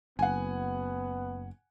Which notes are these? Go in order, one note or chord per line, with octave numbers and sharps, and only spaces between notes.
F#1 B3 F#5 G#5